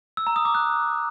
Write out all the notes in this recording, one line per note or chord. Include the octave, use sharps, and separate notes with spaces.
E6
A#5
D#6
D6
F#6